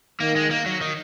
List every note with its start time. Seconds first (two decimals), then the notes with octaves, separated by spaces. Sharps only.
0.20 D#3 A#3
0.36 G#3
0.51 A#3
0.66 F#3
0.81 D#3